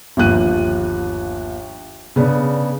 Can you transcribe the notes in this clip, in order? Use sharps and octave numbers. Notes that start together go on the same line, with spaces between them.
G1 D#2 F3 F#6 D#7
C#3 B3 D4